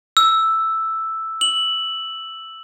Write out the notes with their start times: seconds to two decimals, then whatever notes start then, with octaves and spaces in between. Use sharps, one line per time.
0.17 E6
1.41 F#7